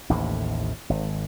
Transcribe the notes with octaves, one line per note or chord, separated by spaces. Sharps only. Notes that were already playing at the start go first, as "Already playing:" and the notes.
A1 D#2 A2 C3
G#1